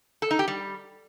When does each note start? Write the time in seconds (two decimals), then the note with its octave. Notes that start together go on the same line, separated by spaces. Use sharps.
0.22 A4
0.31 D#4
0.39 G4
0.48 G3